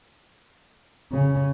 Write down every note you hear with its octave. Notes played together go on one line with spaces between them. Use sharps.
C#3